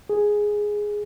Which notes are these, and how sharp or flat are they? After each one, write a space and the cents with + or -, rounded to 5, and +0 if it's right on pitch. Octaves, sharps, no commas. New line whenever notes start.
G#4 +0